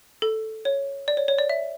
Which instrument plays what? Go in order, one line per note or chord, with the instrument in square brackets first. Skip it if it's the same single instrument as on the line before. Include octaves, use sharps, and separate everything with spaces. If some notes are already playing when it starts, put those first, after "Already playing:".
[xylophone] A4
C#5
D5
C#5
C#5
D5
E5